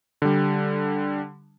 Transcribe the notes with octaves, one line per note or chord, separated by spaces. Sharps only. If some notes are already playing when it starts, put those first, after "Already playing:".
D3 G3